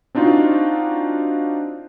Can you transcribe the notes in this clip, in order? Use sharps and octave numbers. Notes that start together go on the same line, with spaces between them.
C4 D4 D#4 F4 F#4